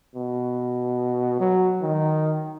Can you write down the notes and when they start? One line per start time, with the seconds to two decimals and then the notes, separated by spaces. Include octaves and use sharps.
0.15 B2
1.40 F#3
1.82 D#3